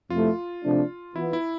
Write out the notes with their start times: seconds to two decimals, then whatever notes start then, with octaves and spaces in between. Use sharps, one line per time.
0.10 F2 C3 F3 A3 E4 F4
0.63 C3 F3 A3 D4
1.15 E3 B3 E4 F4
1.33 E4